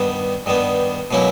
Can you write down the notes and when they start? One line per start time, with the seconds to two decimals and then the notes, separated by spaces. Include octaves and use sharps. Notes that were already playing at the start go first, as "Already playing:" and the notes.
Already playing: G2 D#3 G3 B3
0.46 G2 D#3 G3 B3
1.11 B2 F#3 A#3 C#4 E4